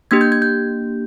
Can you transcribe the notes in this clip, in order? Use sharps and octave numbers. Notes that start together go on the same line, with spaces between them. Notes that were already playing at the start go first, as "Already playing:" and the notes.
A#3 D4 G4 G#6
G6
G#6
G6